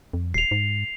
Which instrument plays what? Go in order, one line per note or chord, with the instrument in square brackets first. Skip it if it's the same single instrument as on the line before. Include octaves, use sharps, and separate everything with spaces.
[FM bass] F2
[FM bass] D#1 [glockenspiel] C7 F7
[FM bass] G#2